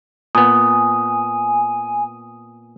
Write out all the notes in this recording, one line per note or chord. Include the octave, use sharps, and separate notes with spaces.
A#2 B3 G#5 D#6